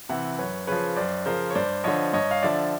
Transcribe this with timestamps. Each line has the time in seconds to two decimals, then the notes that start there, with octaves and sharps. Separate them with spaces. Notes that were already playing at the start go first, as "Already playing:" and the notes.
0.09 C3 E3 E5 F#5
0.38 F#2 B4 C#5
0.67 C#3 F3 B4 C#5
0.96 F#2 C5 D5
1.26 C#3 F3 A#4 C5
1.50 C#5
1.55 G2 C5 D5
1.84 D3 F3 C#5 D#5
2.13 G2 C#5 D#5
2.31 F5
2.43 D3 F3 D5 E5